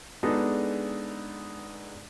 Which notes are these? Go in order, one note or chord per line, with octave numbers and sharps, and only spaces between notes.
G#3 B3 D4 D#4 G#4 A4